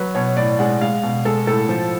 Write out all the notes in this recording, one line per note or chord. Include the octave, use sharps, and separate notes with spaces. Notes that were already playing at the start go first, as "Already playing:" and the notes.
Already playing: F#3 B4
B2 C#5
A2 D5
G#3 F#5
G#3 F5
B2
G#3 A4
A2 A4
F3